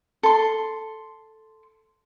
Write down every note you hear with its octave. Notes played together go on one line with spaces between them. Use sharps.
A4 C6